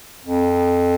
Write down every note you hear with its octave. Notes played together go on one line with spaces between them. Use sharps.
F2